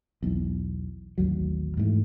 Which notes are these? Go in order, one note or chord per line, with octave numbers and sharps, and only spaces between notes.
B1 E2
A1 D#2 F#3
G#2 E3 F#3 A3